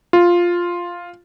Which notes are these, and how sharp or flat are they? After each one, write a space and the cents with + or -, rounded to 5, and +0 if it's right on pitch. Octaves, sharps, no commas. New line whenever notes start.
F4 +0